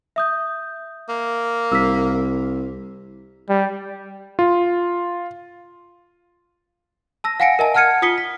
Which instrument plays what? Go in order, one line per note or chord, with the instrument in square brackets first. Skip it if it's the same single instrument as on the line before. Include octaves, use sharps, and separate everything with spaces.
[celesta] E5 D#6 G6
[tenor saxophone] A#3
[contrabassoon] C2 [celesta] E6 B6
[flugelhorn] G3
[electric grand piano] F4
[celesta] A5 E6 A#6
F5 F#5 G#5 A#6 C#7 D7
A#4 D#5 E5 G#5 A5
F#5 A5 F6 G#6 C#7 D#7
F4 D#6 B6 C#7 G7
B6